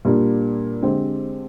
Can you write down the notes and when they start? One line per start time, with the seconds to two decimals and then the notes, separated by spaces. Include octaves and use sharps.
0.05 A#2 G3 A#3 D4
0.82 D3 G#3 C4 G4 C5